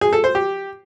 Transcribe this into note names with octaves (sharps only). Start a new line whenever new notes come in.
G#4
A4
C5
G4